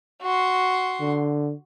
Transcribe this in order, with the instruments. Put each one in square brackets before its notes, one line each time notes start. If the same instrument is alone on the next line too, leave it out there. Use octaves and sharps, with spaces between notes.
[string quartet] F#4 C6
[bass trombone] D3